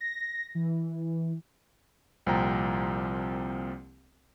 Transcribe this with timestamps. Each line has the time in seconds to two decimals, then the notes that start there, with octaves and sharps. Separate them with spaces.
0.01 A#6
0.55 E3
2.26 C2 A#2 F3 C4 G5 A#5